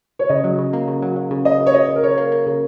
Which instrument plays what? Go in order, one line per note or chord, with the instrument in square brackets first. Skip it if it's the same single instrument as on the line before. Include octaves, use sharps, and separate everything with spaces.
[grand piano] C#5
[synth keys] C#3 [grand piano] D#5
[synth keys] F#3
C#3
A#3
C#3
F#3
F#3
C#3
[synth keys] A#3 [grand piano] D#5
[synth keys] C#3
[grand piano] C#5
[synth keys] C#3 [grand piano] D#5
[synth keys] C#3
[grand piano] A#4
[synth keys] C#3 [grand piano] C#5
[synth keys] A#3
A#3
C#3